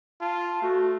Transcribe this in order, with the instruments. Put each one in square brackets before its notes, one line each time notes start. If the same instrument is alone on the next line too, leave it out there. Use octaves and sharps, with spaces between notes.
[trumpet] F4 [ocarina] A5
[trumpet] A3 [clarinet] F#4